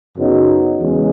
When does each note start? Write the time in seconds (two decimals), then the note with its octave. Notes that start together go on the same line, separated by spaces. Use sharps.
0.16 F#2 C#3 F#3 B3 D#4
0.77 E2 C#3 G#3